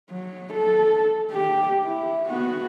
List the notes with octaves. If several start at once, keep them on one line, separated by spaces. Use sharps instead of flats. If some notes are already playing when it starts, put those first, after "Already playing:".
F#3
A4
G4
E4
B3 F#4